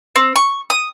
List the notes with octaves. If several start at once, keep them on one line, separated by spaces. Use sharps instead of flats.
C4
C#6
D#6